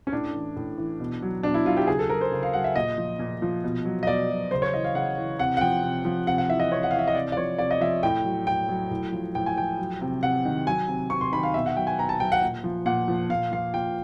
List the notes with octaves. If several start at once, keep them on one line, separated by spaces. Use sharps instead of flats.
C#4
A2 D4
E3
A2
E3
B2
F#3
B2 D4
E4
F#3 F4
G4
C#3 G#4
A4
F#3 A#4
C5
C#3
F5
F#3 F#5
E5
A#2 D#5
F3
A#2
F3
B2
F#3
D#5
B2 D5
F#3
C#3 C5
C#5
E3 D#5
F5
C#3 F#5
E3
C3 F#5
F#5
F3 G5
C3
F3
C3 F#5
F#5
E3 E5
D#5
C3 C#5
F#5
E3 F5
E5
D#5
C3 D5
D5
F3 C#5
C3 D5
D#5
F3 E5
A2 G5
F#3
A2 G5
F#3
A2
F3
A2 G5
G#5
F3 G5
F#3
C3
C3 F#5
D#3
F#3 G#5
C3
C3 C#6
C6
D#3 B5
F5
B2 E5
F#5
F#3 G5
G#5
B2 A#5
A5
F#3 G5
F#5
A#2
F3
A#2 F#5
F3
A#2 F5
F3 F5
A#2 G5